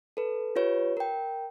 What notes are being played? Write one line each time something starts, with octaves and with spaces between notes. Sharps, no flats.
A4 B4
F4 G4 B4 C#5
A#4 G5